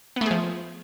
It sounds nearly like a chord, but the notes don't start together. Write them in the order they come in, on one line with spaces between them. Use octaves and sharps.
B3 A3 G#4 F3